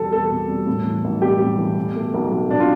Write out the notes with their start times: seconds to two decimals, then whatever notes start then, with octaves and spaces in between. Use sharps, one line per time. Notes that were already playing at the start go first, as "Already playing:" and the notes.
Already playing: E2 B2 G3 G4 A4
0.12 E2 A4
0.31 B2
0.49 G3
0.67 A2
0.85 E3
1.04 B1
1.22 G3 G4
1.41 A2
1.58 E3
1.77 B2
1.96 A3
2.14 B1
2.32 B1
2.49 B2 D4
2.60 F4